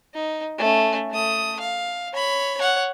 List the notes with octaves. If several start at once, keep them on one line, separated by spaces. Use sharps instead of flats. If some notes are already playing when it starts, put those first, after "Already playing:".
D#4
A3 C#4
A3 D#6
F5
C#5 B5
C#5 F#5